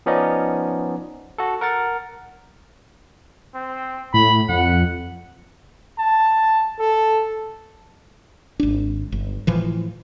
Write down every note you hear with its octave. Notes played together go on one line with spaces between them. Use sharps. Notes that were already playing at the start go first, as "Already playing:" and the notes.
F3 B3 C#4 D#4 D5 D#5
F#4 A4
A#4 F#5 A6
C4
A2 B5
F2 F#5
A5
A4
G#1 D4
G1
A2 E3 F3